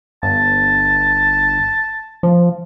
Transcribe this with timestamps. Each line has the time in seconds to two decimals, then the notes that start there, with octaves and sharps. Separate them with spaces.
0.23 G1 A5
2.23 F3